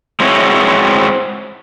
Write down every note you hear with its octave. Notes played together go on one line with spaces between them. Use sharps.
G#3 C4 E4 F#4 C#5